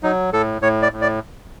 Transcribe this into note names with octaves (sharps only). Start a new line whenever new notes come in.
F#3 D#4
A2 A4
A2 C#5
D5
A2
D5